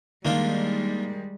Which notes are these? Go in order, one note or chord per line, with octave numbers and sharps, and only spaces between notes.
D#3 G3 G#3 A#3 D4 F4